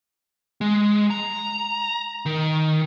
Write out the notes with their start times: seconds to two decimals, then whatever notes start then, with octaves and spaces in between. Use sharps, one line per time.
0.61 G#3
1.11 A#5
2.26 D#3